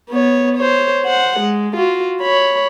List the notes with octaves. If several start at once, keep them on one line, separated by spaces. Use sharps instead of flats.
B3 C#5
C5 C#5
C5 F#5
G#3
F4 F#4
C#5 B5